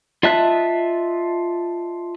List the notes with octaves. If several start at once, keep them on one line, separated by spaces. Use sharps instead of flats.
F4 D#5 E5 A5 F#6